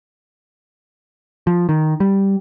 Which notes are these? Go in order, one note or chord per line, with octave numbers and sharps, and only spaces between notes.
F3
D#3
G3